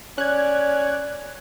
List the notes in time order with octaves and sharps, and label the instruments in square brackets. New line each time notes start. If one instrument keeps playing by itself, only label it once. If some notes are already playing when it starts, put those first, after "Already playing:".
[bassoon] C#4 [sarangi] D5 [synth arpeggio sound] F#6 G#6